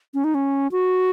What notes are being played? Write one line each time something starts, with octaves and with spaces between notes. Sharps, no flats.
C#4
D#4
C#4
F#4